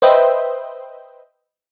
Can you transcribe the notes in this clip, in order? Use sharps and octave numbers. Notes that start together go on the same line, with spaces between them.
B4 C5 D#5 E5 G5